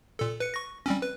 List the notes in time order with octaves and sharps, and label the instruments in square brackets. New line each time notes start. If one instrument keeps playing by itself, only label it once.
[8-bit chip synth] A#2 A4
B4 C#7
C#6 A#6
G3 C4 C#4
B4